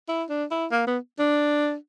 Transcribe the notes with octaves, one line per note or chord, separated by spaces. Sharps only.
E4
D4
E4
A#3
B3
D4